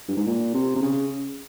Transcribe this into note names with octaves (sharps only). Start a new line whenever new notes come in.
G2
G#2
A#2
C3
C3
C#3